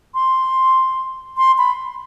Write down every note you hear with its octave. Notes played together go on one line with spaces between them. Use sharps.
C6
C6
B5